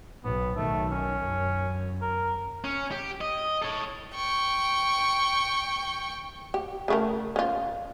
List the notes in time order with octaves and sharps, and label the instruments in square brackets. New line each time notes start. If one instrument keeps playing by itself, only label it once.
[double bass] B1 [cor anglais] B3
[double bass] B1 D#3 [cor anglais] A3
[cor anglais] C#4
[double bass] F#2
[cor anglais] A#4
[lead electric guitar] C#4
G4
D#5
A4 C#5
[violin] G5 C#6
[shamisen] G4
C#3 A3 A#4
C#4 F4